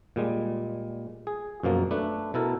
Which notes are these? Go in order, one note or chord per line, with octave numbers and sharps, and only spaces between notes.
A#2 G3 G#3
G#4
F#2 B2 F3 A#3
A3 D4 B4
B2 E4 A4 A#4